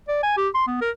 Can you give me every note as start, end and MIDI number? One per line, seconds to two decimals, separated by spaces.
0.08 0.21 74
0.23 0.35 80
0.37 0.49 67
0.55 0.66 84
0.67 0.80 59
0.82 0.90 70